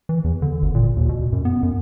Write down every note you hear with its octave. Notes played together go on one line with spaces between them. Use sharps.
E3
E2
D3
G#1
A#2
D#2
B2
F#2
B3
F#2